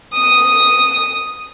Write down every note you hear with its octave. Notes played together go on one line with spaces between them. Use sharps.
D#6